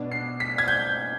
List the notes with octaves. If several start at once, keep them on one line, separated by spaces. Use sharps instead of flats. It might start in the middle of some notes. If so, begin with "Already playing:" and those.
Already playing: B2 B3 D4
C7
B6
G#6
G6